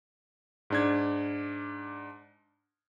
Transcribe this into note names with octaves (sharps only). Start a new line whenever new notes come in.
G#2 D4 G#6